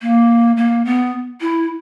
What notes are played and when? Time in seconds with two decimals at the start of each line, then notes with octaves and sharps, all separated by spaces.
0.02 A#3
0.57 A#3
0.85 B3
1.41 E4